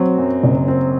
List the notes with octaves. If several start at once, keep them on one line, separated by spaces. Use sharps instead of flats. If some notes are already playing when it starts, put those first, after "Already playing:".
Already playing: F#3 C4
F#2
F#1
C4